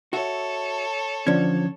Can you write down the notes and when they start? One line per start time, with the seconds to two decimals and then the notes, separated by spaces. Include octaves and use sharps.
0.13 F#4 A4 C#5 E5
1.27 D3 F3 C#4 D4 G#6